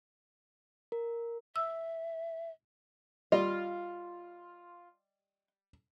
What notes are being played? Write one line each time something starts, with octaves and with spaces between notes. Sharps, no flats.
A#4
E5 E6
G3 F4 D#5